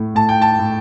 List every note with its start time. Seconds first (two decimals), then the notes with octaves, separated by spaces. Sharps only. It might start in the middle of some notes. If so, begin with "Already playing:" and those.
Already playing: A2 A3
0.15 A2 A5
0.29 G5
0.42 A5
0.59 A2